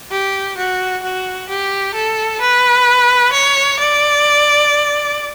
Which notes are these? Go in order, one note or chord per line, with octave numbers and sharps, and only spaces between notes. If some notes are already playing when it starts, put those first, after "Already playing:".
G4
F#4
F#4
G4
A4
B4
C#5
D5